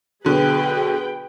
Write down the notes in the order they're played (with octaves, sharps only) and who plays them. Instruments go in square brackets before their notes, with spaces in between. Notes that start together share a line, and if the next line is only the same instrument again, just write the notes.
[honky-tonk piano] B2 D3 F#3 [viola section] G#4 B4 G5